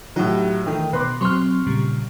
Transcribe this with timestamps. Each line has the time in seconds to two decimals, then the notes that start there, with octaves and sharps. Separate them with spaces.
0.16 A2 F#3 D#4 G4
0.66 D#3 E3 A3 G5
0.93 B2 B4 C6 D6
1.21 F#3 C4 C6 C#6 F6
1.67 A#2 C#3 G3